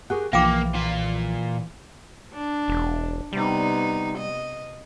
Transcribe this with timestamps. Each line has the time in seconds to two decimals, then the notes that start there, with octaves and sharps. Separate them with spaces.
0.10 G4 G#4 A#4 F#5 C#6
0.33 B1 E3 F3 A#3 F5 G5 D6
0.75 A#2 F4
2.34 D4
2.68 E1
3.33 C3 G3 B3 D#4
4.18 D#5